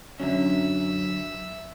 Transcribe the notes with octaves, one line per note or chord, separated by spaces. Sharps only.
F#2 D3 F#3 C#4 E5